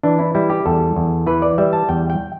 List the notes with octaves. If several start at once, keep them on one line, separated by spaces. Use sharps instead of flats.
E3 D4
E4
G3 E4
G4
E2 A4
E2
E3 B4
D5
G3 E5
A5
E2 G5
G5